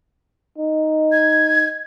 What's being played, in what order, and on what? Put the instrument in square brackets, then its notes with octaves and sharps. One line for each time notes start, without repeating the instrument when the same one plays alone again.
[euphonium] D#4
[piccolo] G#6